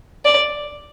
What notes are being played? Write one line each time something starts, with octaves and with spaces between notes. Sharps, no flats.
D5